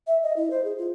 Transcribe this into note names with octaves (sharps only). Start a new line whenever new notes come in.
E5
D#5
E4
C5
G#4
F4